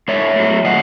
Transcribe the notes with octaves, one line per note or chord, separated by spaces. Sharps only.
G#2 C#5 E5
F#3 A3
D#3 D#5 F#5